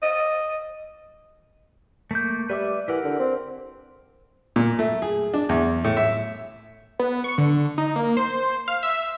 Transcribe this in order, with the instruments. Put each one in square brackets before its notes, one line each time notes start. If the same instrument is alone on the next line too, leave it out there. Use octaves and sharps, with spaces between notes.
[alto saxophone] D#5
[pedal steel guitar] A3 A#3 G6
[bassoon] G3 [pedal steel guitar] B4 E5 D6
[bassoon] E3 [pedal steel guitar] G4 A#4 F#5
[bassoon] D3
C4
[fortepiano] A#2
A3
G#4
D4
E2
A2
E5
[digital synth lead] B3
C#6
D3
D#4
A#3
C5
F5
E5